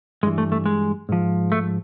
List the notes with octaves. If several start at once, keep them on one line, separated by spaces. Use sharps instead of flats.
G2 E3 G#3
A3
A3
G#3
G#2 F3
A3